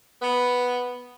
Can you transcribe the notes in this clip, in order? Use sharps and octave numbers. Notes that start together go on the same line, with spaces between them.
B3